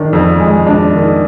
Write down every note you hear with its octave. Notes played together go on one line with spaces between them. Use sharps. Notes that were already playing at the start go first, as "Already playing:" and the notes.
Already playing: D#3 D4
F2
G#3
D4
D#3